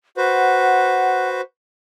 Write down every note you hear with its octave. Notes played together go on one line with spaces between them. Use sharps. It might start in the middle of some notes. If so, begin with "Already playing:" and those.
F#4 B4 C5 F#5